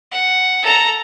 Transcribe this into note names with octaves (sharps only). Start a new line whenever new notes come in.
F#5
A4 A#5